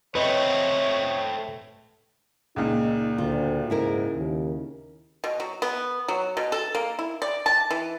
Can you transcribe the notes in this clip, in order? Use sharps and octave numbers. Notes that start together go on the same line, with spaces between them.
A3 C4 B4 C#5 D#5
C#2 A#2 D#4
D2 F4
G#2 C#3 E4 A#4
D#2
B2
F#3
B3
F#3
B2
A4
A#3
E4
D5
A5
E3